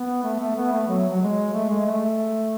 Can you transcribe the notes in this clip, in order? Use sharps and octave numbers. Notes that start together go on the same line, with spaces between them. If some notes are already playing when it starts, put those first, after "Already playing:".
Already playing: B3
A3
A3
B3
A3
F#3
F#3
G#3
A3
G#3
A3